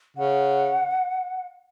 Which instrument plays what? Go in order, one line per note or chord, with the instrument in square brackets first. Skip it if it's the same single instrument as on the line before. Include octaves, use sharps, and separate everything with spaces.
[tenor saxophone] C#3 [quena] F#5